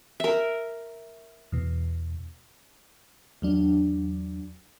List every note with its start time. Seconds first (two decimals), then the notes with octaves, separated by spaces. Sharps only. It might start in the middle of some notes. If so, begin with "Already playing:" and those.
0.20 A#4 E5
1.52 E2 B2
3.42 E2 F#3 D4